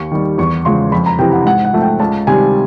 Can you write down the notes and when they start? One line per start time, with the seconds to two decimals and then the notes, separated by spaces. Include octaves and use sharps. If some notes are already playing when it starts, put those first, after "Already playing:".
Already playing: D#2 C#6
0.12 D#3 G3
0.38 E2 C#6
0.65 C#3 F3 G#3 C6
0.92 F2 B5
1.06 A#5
1.19 C3 E3 G5
1.32 F#5
1.46 G#2 F#5
1.65 F#5
1.73 F3 A3
1.82 G5
2.00 C#2 A5
2.27 C3 D#3 G3 G#5